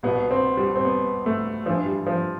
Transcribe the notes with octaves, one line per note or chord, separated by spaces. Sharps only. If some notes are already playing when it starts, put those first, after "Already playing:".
C2 B2 B3
C4
G3
C4
B3
A3
G2 E3 F3
G3
F3